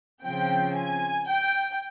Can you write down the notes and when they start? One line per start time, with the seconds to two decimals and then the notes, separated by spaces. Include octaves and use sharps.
0.24 C#3 F3 C4 G5
0.77 G#5
1.29 G5